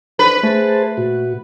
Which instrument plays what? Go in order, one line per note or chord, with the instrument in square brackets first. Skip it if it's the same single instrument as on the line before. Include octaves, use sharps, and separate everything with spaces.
[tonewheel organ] D4 C5 [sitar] B4
[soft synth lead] A3 [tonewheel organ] G#4 C5 A5
[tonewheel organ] A#2 F#4